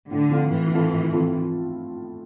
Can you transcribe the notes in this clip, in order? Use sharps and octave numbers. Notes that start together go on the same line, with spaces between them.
A2 D3
F3 C4 F4 A4
A2 E3
F3 C4 F4 A4
A2
F3 C4 F4 A4